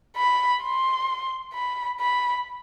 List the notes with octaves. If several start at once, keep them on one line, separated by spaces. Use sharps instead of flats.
B5
C6
B5
B5